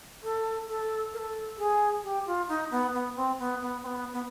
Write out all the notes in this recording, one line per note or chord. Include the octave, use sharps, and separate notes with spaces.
A4
A4
A#4
A4
G#4
G4
F4
D#4
B3
B3
C4
B3
B3
C4
B3
B3